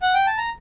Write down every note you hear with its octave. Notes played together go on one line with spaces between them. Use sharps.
F#5
G5
A5
A#5